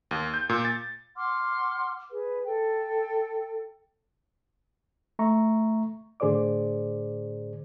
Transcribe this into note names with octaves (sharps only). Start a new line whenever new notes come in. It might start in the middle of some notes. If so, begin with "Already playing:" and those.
D#2
G6
A#2
A6
F#5 C6 D6 F6
G#4 B4
A4 G5
A3 E5 A#5 C#6
A2 D3 G#4 C5 D5 D6